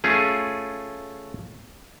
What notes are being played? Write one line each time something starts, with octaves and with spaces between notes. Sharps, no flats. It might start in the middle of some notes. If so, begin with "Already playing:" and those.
A3 C#4 F4 G#4